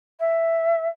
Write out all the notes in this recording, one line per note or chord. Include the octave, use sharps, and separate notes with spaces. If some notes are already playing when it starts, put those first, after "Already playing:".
E5